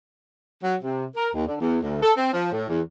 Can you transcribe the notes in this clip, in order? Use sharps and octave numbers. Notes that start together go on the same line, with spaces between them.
F#3
C3
A#4
D#2
D3
E2
D2
A4
C4
F3
A2
E2